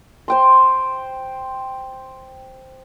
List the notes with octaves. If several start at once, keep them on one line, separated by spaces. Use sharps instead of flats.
C5 G5 C6